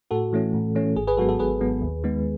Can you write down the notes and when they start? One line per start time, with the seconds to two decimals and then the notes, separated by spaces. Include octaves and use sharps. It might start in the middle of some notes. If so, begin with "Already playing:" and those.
0.11 A2 F#4 A4
0.33 E3 A3 C#4
0.54 A2
0.75 E3 A3 C#4
0.96 G#1 G#4
1.07 G#4 B4
1.17 G#2 F#3 B3 F#4 A4
1.29 F#4 A4
1.39 G#1 G#4 B4
1.61 G#2 F#3 B3
1.81 D#2
2.03 D#3 G#3 B3